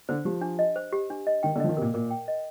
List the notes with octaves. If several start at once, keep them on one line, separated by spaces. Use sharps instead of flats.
D3 C5
F3 G4
D4
D#5
C5
G4
D4
D#5
D#3 G5
D3
F3 D#5
D#3
A#2 C3 A#4
A#2 A#4
G5
D#5